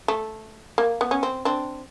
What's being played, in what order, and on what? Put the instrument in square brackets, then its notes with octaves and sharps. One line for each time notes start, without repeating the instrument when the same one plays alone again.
[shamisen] A3
A#3
B3
C#4
C4
C4 D4